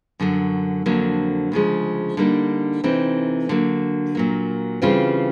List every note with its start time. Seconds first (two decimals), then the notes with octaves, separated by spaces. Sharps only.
0.20 F#2 D3 F#3
0.86 F2 D3 F#3 A#3 D4
1.52 D2 C#3 F3 G#3
2.17 D3 G3 A#3 D#4
2.84 C3 E3 A3 C4 D#4
3.49 D3 F#3 A#3
4.15 A#2 F#3 A#3
4.82 C#3 E3 G3 C4 F4